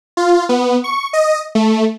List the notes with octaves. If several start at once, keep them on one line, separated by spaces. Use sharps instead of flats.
F4
B3
C#6
D#5
A3